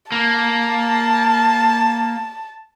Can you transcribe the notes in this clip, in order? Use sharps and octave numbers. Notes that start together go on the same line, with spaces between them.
A#3 A5